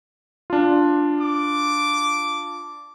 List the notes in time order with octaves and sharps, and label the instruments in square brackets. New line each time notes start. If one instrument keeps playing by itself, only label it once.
[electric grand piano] D4 F4
[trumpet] D6